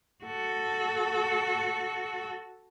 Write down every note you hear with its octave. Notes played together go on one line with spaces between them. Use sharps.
F#4 A4